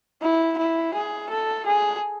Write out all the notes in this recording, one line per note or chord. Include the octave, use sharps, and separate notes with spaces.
E4
E4
G#4
A4
G#4